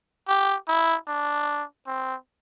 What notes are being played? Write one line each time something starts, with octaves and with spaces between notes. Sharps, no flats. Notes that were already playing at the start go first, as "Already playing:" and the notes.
G4
E4
D4
C4